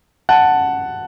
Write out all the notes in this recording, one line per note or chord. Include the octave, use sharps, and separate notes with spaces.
F#5 A5